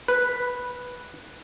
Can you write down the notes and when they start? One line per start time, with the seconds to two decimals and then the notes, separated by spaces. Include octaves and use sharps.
0.08 B4